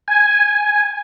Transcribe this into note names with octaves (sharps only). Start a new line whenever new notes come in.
G#5